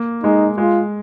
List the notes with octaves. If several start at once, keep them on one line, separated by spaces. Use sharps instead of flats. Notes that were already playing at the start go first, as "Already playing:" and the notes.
Already playing: A#3
G#3 D#4
G#3 F4